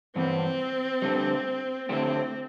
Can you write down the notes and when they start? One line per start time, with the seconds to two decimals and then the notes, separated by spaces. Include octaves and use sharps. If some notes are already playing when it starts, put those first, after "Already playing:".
0.16 G2 E3 B3 C4
1.02 D2 D3 G3
1.89 D3 A3 C4 E4 G4 C5